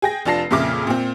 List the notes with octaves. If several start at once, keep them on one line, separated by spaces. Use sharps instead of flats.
G#4 G5 A#6
F1 D4 F4 A5 A#6 C7
F2 A#2 C#3 E5 D6 F6
A#2 C4